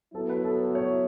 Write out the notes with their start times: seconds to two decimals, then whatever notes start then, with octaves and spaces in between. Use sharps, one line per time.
0.13 F#3 B3 E4 A4
0.29 B4
0.45 A4
0.60 B4
0.75 C#5